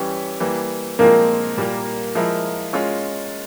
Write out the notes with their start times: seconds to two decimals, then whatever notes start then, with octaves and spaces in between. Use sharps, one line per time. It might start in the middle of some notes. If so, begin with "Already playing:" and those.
Already playing: E3 G3 C#4 G4 C#5
0.40 E3 G3 A#3
0.99 A#2 F3 G#3 A#3 C4
1.57 A#2 G3 A#3
2.15 F3 G#3 E4 A#4
2.73 G#3 C#4 F4